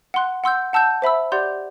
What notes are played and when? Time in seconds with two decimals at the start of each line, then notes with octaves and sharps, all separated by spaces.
0.14 F#5 C6 F#6
0.44 F#5 C6 E6 G6
0.73 F#5 A5 E6 G6
1.02 C5 E5 B5 E6
1.32 G4 D5 F#5 C6 G6